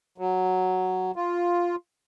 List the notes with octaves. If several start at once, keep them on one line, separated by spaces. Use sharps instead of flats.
F#3
F4